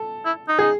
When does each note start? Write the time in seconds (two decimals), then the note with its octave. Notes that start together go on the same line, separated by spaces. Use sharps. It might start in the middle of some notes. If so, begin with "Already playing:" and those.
Already playing: A4
0.25 E4
0.48 D#4
0.59 D#4 G#4